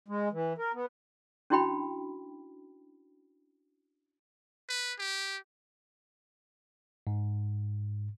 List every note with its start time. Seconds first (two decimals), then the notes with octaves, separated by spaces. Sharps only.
0.08 G#3
0.32 E3
0.58 A#4
0.74 B3
1.50 C#4 D4 E4 F#4 G5 B5
4.69 B4
4.99 G4
7.07 G#2